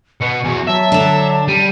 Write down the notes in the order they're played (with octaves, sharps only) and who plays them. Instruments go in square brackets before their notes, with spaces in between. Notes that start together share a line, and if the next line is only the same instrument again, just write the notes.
[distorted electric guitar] B2 B3 [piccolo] C#7
[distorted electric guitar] E2 [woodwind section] F#4 [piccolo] G#5
[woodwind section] F#3 [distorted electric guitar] E5 [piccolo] A5
[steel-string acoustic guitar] D3 D4
[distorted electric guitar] G3 [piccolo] D#7